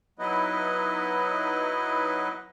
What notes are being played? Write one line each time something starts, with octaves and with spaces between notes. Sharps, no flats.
F#3 B3 D#4 E4 B4 D#5